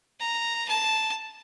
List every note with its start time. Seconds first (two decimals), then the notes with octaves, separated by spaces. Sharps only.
0.20 A#5
0.68 A5